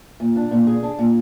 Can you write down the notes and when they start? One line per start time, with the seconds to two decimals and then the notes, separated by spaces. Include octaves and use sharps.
0.20 A#2
0.36 D4
0.51 A#2
0.67 G#4
0.83 D4
0.99 A#2